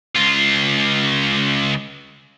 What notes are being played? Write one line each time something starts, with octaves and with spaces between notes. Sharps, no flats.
C#2 F4